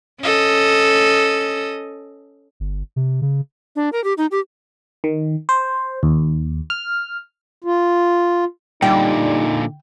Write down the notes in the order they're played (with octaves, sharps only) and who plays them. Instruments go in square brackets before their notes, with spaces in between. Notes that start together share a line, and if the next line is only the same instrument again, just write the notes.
[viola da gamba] C#4 A4 D#5
[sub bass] G1
C3
C#3
[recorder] D4
A#4
G4
D#4
G4
[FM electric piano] D#3
C5
D#2
F6
[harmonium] F4
[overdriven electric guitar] A#2 D3 [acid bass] G3 [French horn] D#4 [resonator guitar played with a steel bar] G5